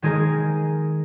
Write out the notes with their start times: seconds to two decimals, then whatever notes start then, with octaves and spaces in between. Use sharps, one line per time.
0.02 D#3 G#3 G#4 A#4 D#5